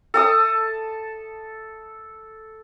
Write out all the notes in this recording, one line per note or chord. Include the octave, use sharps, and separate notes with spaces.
A4 A5 D#6